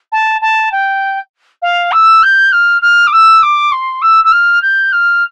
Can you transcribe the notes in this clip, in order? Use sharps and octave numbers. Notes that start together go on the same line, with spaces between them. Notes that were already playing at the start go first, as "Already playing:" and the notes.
A5
A5
G5
F5
E6
G6
F6
F6
D6
E6
D6
C6
E6
E6
F6
G6
F6